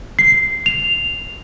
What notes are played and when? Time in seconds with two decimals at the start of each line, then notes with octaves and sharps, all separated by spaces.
0.19 C7
0.66 F7